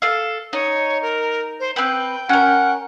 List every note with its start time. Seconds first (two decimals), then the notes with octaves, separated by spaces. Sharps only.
0.02 A4 F5
0.53 D#4 C#5
1.02 A#4
1.60 C5
1.76 C4 B4 G5
2.29 C#4 A#4 F#5